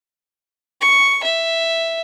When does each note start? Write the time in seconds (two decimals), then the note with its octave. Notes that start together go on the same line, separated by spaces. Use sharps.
0.81 C#6
1.24 E5